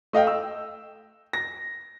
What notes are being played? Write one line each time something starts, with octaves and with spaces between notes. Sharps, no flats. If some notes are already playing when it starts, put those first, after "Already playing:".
A3 D#5 F5 G5
E6
A#6